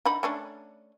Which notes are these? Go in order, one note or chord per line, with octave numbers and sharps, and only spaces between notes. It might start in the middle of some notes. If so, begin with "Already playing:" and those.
D3 D#4 B5
A3 C#4 D4